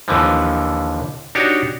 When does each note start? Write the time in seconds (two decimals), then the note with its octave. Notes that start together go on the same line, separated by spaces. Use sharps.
0.08 D#2 D3 E3 F3
1.35 D4 D#4 F#4 G4 C#5